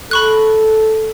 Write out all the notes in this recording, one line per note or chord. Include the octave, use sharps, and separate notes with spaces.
A4 B5 C#6 F#6